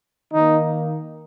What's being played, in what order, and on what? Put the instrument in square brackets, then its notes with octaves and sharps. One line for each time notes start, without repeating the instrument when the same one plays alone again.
[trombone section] D#3 A#3 D#4